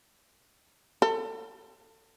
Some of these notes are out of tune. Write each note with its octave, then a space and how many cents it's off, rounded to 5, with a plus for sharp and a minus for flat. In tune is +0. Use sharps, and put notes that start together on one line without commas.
A4 +30